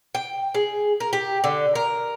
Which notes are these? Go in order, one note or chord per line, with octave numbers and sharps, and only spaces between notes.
G5
G#4
A#4
G4
D3
A#4